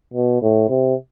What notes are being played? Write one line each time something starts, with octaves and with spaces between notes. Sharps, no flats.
B2
A2
C3